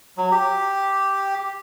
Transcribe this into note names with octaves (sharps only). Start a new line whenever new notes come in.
F#3
G4